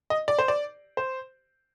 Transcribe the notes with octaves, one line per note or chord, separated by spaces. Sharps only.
D#5
D5
C5
D5
C5